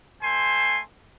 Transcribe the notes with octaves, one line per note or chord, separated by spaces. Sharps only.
A3 C5 G#5 C6